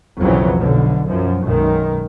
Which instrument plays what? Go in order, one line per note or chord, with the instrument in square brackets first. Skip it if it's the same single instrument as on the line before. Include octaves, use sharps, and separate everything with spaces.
[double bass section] B1 F2 C#3 E3 F#3
B1 B2 D3
F#2 F3
B1 F#2 D#3 G#3